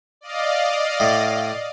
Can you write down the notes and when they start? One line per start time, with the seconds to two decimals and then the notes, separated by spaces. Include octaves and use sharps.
0.21 D5 D#5 F5
1.00 A2